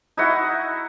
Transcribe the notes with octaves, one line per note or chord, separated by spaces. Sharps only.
D#4 E4 F#4 F#5